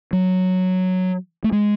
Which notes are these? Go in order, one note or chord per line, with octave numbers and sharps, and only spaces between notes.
F#3
A3
G#3